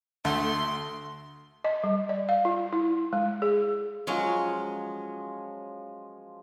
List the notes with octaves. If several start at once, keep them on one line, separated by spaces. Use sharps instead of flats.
D2 A3 C6
D#5
G3
D5
F5
F4
E4
G#3
G#4
F3 F#3 G#3 C#4 C#5 D#5